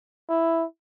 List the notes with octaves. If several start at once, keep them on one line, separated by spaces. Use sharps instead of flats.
E4